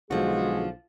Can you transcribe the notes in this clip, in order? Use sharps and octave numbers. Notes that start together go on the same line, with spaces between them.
B1 D3 F3 G#3 F#4 G#4